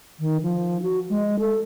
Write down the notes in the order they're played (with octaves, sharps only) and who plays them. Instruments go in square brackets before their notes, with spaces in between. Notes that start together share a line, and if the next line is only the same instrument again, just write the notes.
[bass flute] D#3
F3
F#4
G#3
A4